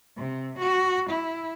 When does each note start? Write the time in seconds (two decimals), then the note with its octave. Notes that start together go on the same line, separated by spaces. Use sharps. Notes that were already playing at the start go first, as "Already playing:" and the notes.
0.17 C3
0.59 F#4
1.09 E4